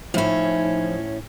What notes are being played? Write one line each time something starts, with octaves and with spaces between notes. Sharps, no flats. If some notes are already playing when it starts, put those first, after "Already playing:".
A2 F3 C#4 D#4 E4